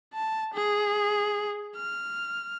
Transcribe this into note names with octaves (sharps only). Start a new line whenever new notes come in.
A5
G#4
F6